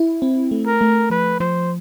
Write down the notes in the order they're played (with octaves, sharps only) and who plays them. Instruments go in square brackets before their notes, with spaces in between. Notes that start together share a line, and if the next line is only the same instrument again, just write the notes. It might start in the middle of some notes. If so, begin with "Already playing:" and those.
Already playing: [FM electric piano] E4
C4
A3
[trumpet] A#4
[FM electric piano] A3
[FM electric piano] F3 [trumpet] B4
[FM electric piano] F3 [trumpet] C5